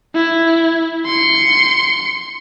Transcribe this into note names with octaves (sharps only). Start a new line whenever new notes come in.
E4
C6 C#7